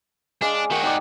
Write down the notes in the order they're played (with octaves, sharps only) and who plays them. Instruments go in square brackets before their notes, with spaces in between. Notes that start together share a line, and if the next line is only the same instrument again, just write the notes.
[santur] G#3 F5 D6 [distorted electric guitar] D4
[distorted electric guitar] D#3 F#4 [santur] A#3 F5 G5
[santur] D#4 D5